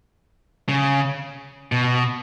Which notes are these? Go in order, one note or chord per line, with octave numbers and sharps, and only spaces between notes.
C#3
B2